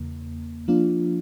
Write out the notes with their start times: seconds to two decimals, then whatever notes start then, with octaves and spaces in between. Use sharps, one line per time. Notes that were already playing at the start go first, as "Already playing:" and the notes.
Already playing: E2 C#3 A#3
0.68 F3 A#3 D4 F4